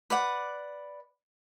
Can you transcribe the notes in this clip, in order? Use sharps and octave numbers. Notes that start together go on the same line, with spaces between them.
B4 D5 F#5